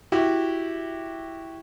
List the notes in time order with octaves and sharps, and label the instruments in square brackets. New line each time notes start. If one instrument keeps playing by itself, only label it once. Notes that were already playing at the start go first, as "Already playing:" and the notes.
[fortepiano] E4 F#4 G4